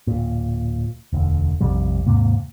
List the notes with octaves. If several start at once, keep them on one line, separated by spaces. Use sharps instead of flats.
D1 A#2
E1 D2
A#1 F2 C3 G3
D#2 G#2 C3 A#3